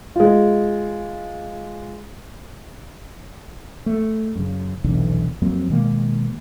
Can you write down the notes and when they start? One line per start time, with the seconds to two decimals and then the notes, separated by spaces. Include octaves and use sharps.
0.16 G#3 F4
3.86 A3
4.36 F#2 C#3
4.84 F1 B1 E2 D3
5.42 F2 F#3 A#3 C4
5.70 B2 D#3 G#3 A#3